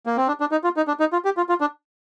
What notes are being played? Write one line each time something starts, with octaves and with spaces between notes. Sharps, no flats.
A#3
C4
D4
D4
D#4
F4
D#4
D4
D#4
F4
G4
F4
F4
D4